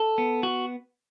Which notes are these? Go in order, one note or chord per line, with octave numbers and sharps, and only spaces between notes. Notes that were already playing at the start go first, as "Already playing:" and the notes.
Already playing: A4
B3
F#4